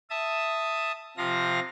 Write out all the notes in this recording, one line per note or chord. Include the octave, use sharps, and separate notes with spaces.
E5 A5 D#6
C3 F3 F5 A#6